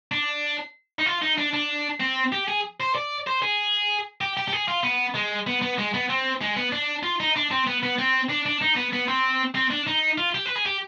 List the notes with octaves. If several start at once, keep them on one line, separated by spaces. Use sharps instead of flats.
D4
D#4
F4
D#4
D4
D4
C4
G4
G#4
C5
D5
C5
G#4
G4
G4
G4
G#4
F4
B3
G#3
B3
B3
G#3
B3
C4
G#3
B3
D4
F4
D#4
D4
C4
B3
B3
C4
D4
D4
D#4
B3
B3
C4
C4
D4
D#4
F4
G4
B4
G#4
G4